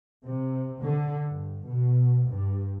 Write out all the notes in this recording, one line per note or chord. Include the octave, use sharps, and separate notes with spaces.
C3
D3
G2
B2
G2